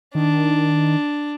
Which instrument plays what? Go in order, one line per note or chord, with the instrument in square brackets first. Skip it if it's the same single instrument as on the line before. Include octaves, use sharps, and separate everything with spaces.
[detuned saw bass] D#3 [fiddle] D4